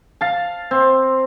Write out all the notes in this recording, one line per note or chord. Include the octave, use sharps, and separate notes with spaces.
F5 A5
C4